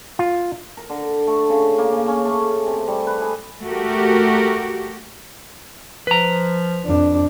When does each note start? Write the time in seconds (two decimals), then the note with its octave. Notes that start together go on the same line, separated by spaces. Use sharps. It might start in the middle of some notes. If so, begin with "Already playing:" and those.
0.19 F4
0.77 A#4
0.90 D3
1.27 A3
1.50 C#3
1.78 A#3
1.93 C#3
2.08 C#4
2.25 A3
2.66 C3
2.88 G3
3.07 B4
3.22 G#4
3.65 A3 F#4 G4 A#4
6.07 F3 B4 A#5
6.85 F2 D4